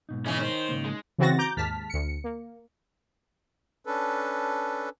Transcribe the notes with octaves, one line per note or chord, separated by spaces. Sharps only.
G#2 B2 D#4
C#3 E3 G#3 C#4
D#3 C5
G#2 C#3 A#3
G#3
C#3 E3 C4 F#4 A6 A#6
A#5 D6 G6
D#2 G#2 A5 F6 B6
D2 C#7
A#3
C#4 D4 A4 B4